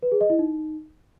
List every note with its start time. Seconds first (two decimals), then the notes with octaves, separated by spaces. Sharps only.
0.03 B4
0.12 G#4
0.21 D#5
0.30 E4
0.39 D#4